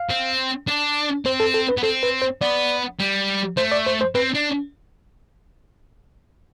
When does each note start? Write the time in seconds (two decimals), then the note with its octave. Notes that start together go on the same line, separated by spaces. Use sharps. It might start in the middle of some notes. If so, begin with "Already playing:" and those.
Already playing: F5
0.09 C4
0.68 D4
1.25 C4 C5
1.40 A4
1.54 A4
1.69 B4
1.77 B3
1.83 C4 A4
2.03 B4
2.22 C5
2.41 B3 D5
2.99 G3
3.57 A3 C5
3.72 D5
3.86 C5
4.01 C5
4.15 C4 B4
4.35 D4